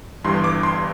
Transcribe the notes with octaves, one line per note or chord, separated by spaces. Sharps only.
G1 G2 E3 G3 C6
D6
C6